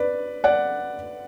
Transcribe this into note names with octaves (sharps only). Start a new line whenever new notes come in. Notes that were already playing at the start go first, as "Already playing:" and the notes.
Already playing: B4 D5
D5 F#5